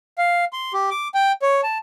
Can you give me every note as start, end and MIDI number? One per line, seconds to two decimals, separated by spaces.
0.18 0.45 77
0.53 0.73 84
0.73 0.90 67
0.91 1.08 86
1.14 1.32 79
1.42 1.61 73
1.63 1.78 81